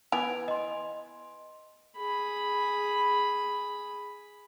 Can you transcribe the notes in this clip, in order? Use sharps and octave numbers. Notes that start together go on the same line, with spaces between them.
E3 B3 G#5 D7 F7
D#5 C6
G#4 B5